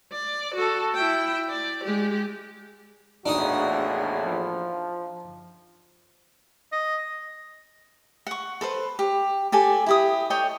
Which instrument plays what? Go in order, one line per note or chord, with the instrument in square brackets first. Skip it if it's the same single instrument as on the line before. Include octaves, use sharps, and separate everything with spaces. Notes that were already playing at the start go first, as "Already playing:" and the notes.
[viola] D5
F#4 A4
E4 G5
D5
G#3 G4
[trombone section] A#1 E2 A2 [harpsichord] D4 D#4 D#6 [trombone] F#4
[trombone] F3
[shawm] D#5
[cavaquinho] F#5 C#6
A4 B4 C5
G4
G4 A4 D5 G#5
E4 G4 D#6
A4 C#5 D#5 G5